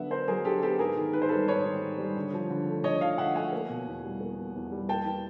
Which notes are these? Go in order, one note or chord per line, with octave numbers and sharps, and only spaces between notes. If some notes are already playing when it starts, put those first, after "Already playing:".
Already playing: D3 F#3 B3 D4 E5 F#5
D4 A#4 C5
F#3 G#4 A#4
D3 G4 A4
B3 G4 A4
G#2 G#4 A#4
D#3
G#2 B4
C5
G3 A4 B4
G#2 B4 C#5
D#3
G#2
G3
D3
F3
D3
A3
D3 C#5 D#5
F3 D#5 F5
D3 E5 F#5
A3 F#5 G#5
A#3
B2
E2
G3
A#3
B2
E2
G3
A#3 G5 A5
E3